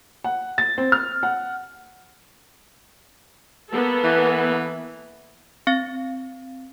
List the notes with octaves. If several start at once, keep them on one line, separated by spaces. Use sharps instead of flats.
F#5
A6
C4
F6
F#5
A#3 B3 A4
E3
C4 F5 A6